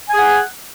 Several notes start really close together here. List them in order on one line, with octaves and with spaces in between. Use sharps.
G#5 G#4 F#5